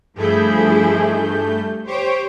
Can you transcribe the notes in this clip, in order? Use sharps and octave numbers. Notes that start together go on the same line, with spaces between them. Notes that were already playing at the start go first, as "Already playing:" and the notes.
G2 F3 A3 E4 G#4 G6
G4 C5 C#5 D7